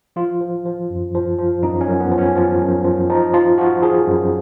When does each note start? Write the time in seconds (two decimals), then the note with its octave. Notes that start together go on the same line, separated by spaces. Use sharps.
0.16 F3 F4
0.41 F3
0.65 F3
0.90 F#2
1.14 F3
1.39 F3
1.63 F#2 D#4
1.81 C#4
1.88 F#2
2.00 B3
2.11 F3
2.18 C#4
2.36 F3
2.61 F#2
2.84 F3
3.10 F3 D#4
3.34 F3 F4
3.58 F3 F#4
3.82 F3 G#4
4.07 F#2